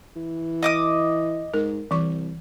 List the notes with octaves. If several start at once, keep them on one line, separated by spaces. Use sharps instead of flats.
E3
D#5 D6 D#6
G#2 A#4
C2 E3 C#6